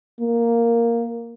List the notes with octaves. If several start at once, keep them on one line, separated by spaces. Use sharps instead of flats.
A#3